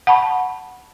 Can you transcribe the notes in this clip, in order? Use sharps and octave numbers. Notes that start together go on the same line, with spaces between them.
F#5 A5 B5 C#6